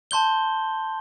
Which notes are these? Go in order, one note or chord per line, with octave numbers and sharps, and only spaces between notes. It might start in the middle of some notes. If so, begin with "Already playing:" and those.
A5 C6 G6 G7